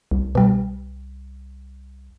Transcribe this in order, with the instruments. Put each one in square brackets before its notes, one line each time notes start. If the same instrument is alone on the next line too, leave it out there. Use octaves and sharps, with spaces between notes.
[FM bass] C2
[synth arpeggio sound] B2 G3